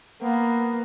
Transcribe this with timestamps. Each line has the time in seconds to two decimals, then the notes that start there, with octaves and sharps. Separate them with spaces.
0.22 A#3 B3